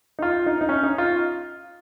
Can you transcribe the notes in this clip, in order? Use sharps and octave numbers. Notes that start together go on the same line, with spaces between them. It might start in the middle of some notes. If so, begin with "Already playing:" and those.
D#4
F4
D#4
D#4
C#4
D#4
F4